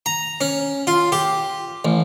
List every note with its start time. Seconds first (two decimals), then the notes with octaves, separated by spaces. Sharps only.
0.06 A#5
0.41 C#4
0.87 F4
1.12 G4
1.85 A1